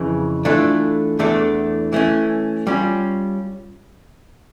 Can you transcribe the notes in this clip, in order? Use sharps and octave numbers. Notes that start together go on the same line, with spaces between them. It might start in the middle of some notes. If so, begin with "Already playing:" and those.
Already playing: F2 C#3 E3
E3 A3 D4 F4 A4
E2 E3 A3 D4 A4
E3 A3 C#4
G3 C#4 F4